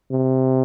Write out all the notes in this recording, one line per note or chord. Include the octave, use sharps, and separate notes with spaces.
C3